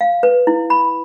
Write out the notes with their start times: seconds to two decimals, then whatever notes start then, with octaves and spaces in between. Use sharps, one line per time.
0.01 F5
0.23 B4
0.47 E4
0.70 B5